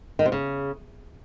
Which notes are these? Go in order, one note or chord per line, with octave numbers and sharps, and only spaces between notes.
D#3
C3
C#3